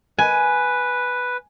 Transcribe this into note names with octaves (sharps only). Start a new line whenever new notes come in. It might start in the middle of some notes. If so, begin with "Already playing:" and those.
B4 G#5